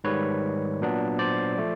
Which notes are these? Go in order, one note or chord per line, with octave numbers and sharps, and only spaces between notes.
G#2 D#3 G3 B4 C#5
A#2 F#3 B3 D4
C5 D5
F3 A3